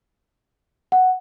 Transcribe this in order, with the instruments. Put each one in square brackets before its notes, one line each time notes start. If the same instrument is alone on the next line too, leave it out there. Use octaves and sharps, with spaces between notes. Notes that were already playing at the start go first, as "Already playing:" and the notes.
[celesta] F#5